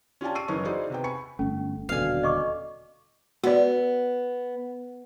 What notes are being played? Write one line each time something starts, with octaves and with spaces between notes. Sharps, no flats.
C#4 F4 G4 D5 G#5 A5
C#6 E6 C7 D7 D#7
F#1 E3 C#4 D#4 C#6
D#4 E4 F#4 G#4 C5 D5
C3 B3 G5
G#5 B5 C#6 C#7
G1 A3 C#4
D#1 B2 D3 F#4 A4 D5 F5 G#5
D#5 C#6 D6
B3 F#4 D5